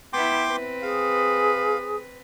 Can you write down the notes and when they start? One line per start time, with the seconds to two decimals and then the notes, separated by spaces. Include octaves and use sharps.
0.13 B3 E4 G5 C6 D6
0.48 C4 B4
0.82 G#4 F5